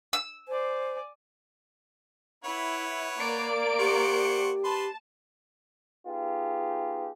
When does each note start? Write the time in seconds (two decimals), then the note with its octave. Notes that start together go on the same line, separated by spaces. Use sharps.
0.13 E6
0.48 C5 D5 G#5
2.45 E4 B4 C#5 F#5
3.19 A#3 D5 D7
3.79 G4 C5 F#5 C#6
4.64 B4 A5 C6
6.07 B3 D#4 F4 G4 G#4